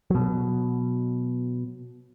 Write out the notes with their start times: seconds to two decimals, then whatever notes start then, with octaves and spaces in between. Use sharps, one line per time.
0.10 B2 F#3